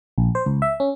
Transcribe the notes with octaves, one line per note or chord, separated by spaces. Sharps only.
A#1
C5
C#2
E5
C#4